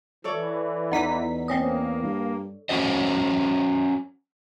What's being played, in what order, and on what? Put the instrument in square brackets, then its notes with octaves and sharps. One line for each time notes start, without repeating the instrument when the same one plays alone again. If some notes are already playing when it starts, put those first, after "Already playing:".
[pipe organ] E3 [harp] A4 C#5 D5
[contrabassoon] E2 [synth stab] B3 D#4 B6
[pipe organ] A#3 [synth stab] C4 C#4 D#5
[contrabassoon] G2
[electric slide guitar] C#4 F#4 C5 D#5